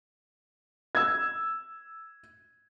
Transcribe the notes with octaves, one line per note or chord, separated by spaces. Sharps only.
E6 G#6